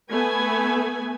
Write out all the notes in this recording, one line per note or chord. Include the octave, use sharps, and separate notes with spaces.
A3 B3 B4 G#5